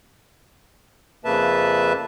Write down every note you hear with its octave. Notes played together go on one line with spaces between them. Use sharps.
F2 C#3 A#3 B4 E5 A5